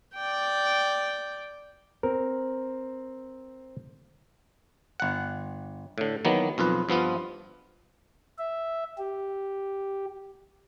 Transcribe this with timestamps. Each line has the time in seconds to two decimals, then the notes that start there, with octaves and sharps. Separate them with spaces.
0.15 D5 G5
2.03 C4 A#4
5.00 G1 F#5
5.98 A2 D3
6.25 D#3 E3 F#3 A#3 B3
6.58 B1 F2 F4 B4
6.89 G2 F3 B3 F4
8.38 E5
8.98 G4